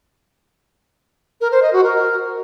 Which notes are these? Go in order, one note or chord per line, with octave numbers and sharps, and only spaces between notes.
A#4
C5
D#5
F#4
A#4